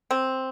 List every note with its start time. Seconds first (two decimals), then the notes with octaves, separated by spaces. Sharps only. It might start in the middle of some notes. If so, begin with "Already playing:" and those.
0.11 C4